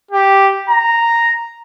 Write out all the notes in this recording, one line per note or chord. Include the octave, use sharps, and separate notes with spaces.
G4
A#5